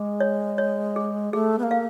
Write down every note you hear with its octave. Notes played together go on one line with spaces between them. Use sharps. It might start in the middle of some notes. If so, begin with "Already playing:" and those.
Already playing: G#3 G#4
C#5
C#5
G#4
A3 G#4
B3
A#3
F5